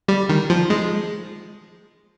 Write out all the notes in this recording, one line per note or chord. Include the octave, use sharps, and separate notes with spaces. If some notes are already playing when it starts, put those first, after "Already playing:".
G3
D#3
F3
G#3